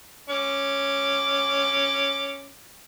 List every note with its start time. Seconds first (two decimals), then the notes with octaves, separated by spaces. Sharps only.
0.29 C#4 D6